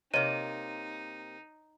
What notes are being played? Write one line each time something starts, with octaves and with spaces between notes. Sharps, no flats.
C3 A#3 D#4 E4 C#5 D#5 D#7